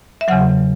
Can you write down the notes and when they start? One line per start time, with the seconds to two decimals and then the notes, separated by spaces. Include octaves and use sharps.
0.21 E5
0.28 E2 C#3 F#3 F#5